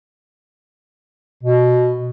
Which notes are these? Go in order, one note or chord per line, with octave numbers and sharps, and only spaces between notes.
B2